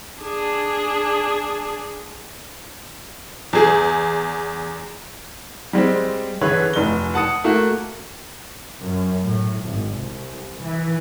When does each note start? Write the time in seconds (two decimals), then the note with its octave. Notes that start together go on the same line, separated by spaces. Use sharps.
0.22 D4 G#4
3.53 E2 G#4
5.73 G3 G#3 C4
6.41 D3 E3 E4 G#4 B4 C#5
6.73 F1 G7
7.14 F#5 A5 D#6 C#7
7.44 A3 A#3 F#4
8.80 F#2
9.23 A2
9.64 G#1
9.95 C2
10.61 E3